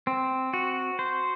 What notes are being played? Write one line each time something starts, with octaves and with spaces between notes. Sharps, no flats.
C4
F#4
C5